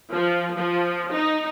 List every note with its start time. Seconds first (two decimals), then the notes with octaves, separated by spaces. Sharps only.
0.14 F3
0.58 F3
1.12 D#4